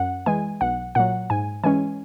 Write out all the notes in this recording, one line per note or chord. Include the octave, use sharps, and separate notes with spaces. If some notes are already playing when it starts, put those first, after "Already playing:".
Already playing: F#2 F#5
E3 G#3 G#5
B1 F#5
A#2 F#3 F#5
G#2 G#5
E3 G#3 C#4 G#5